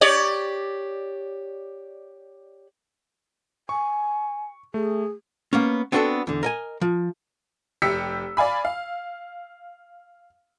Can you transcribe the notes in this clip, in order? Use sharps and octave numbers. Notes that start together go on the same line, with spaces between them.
G4 C#5 D5
G#5 C#6
A3 G#4
A#3 B3 C#4
B3 C4 D4 F#4 G4 A4
E2 D3
A#4 D#5 G#5
F3
F1 G4 E6 B6 C#7
D5 F5 G#5 B5
F5